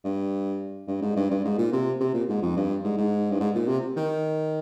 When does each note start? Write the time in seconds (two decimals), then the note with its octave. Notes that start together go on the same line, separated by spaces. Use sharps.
0.05 G2
0.88 G2
1.02 G#2
1.16 G2
1.31 G2
1.45 G#2
1.59 A#2
1.73 C3
2.00 C3
2.14 A#2
2.29 G#2
2.42 F2
2.56 G2
2.84 G#2
2.98 G#2
3.31 G2
3.40 G#2
3.55 A#2
3.68 C3
3.97 D#3